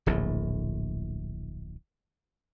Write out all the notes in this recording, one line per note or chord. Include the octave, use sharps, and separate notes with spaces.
D1 A#1 A2